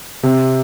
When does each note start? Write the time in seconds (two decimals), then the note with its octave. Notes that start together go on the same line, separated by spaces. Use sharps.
0.23 C3